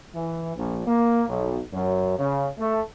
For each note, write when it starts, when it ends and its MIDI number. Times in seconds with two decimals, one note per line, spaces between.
0.15 0.54 52
0.56 0.84 34
0.85 1.23 58
1.28 1.60 35
1.72 2.18 42
2.18 2.47 49
2.58 2.80 57